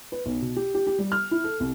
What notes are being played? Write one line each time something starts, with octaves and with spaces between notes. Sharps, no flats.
B4
B1
B2
G4
G4
G4
G3
F6
E4
A4
C2